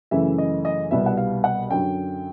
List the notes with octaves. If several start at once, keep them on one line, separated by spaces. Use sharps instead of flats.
F#2 C#3 E3 A3 E5
D#5
D#5
C2 B2 G3 B3 E5
F#5
F5
F#5
F#2 D3 F#3 G5